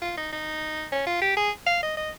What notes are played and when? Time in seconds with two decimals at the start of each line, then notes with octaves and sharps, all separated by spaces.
0.02 F4
0.17 D#4
0.33 D#4
0.92 C#4
1.07 F4
1.22 G4
1.37 G#4
1.67 F5
1.83 D#5
1.97 D#5